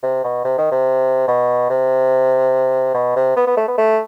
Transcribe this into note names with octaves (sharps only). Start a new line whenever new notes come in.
C3
B2
C3
D#3
C3
B2
C3
B2
C3
B3
B3
A3
B3
A3